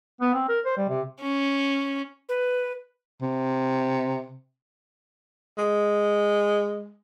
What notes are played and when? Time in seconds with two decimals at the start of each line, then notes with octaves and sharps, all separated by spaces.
0.21 B3
0.34 C4
0.48 A#4
0.65 C5
0.77 G3
0.89 C3
1.22 C#4
2.29 B4
3.22 C3
5.58 G#3